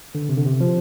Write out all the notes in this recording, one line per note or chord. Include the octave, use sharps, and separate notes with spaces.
D3
C3
D3
C3
F3